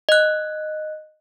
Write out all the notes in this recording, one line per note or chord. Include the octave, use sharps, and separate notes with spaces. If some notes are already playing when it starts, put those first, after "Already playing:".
D#5 F#6